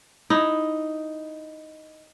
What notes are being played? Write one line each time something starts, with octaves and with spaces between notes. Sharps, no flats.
D#4 E4